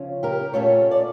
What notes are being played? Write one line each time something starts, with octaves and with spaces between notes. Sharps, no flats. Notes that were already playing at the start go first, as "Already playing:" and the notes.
Already playing: C#3 F3 C#4
G4 A#4
A#2 A3 C#4 A4 C#5
D5